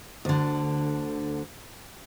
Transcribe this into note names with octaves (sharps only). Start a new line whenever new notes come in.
D2 D3